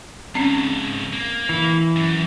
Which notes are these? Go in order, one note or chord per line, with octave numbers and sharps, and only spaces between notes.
G#2 C#3 C4 C#4
A#3
E3
F#2